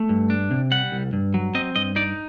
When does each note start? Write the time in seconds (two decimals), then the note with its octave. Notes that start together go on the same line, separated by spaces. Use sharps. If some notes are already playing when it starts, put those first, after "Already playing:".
Already playing: A3
0.09 G2
0.30 D4
0.51 C3
0.71 G3 F#5
0.92 C2
1.13 G2
1.34 F#3
1.55 C4 D#5
1.76 G2 D#5
1.96 D#4 D5